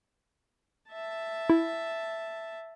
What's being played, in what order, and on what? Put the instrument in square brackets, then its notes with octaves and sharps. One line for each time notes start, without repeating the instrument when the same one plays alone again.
[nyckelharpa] E5 A5
[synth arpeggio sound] E4